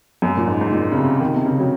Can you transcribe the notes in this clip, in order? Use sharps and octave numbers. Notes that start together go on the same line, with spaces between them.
F#2
A#2
G#2
G#2
A#2
C#3
C3
D#3
C3
C#3
F#3